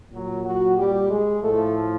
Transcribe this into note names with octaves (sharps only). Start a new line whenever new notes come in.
A#2 F#3
F#3 F#4
G3 G4
G#3 G#4
A2 F3 A3 A4